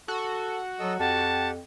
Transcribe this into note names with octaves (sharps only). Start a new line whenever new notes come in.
F#4 A4
F#3 A4 D#5 E6
F2 G4 F#5 A5